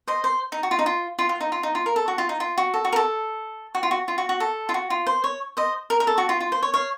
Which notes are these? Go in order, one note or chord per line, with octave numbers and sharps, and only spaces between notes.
C5 D#5
C5
D#4
F#4
F4
D#4
F4
F4
F4
D#4
F4
D#4
F4
A#4
A4
F#4
F4
D#4
F4
F#4
A4
F#4
A#4
A4
F#4
F4
F#4
F4
F#4
F#4
A4
F4
F#4
F4
C5
C#5
C5 D#5
A#4
A#4
A4
F#4
F4
F4
C5
C#5
C#5 F5